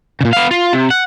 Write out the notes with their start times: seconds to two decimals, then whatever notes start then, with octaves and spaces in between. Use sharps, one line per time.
0.21 A#2 C#3
0.33 B3 F5
0.51 F4
0.73 C3
0.90 F#5